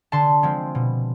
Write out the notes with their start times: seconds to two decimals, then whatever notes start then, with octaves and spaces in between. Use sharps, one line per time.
0.12 D3 A5 C6
0.43 F3 G#3 C4
0.75 B2